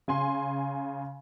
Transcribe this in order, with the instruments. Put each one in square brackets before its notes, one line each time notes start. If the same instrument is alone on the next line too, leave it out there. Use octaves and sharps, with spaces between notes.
[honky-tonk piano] C#3 G#5 C6